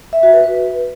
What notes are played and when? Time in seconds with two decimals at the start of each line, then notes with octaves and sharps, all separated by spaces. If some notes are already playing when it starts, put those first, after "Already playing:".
0.13 E5
0.23 F#4
0.33 B4
0.44 B4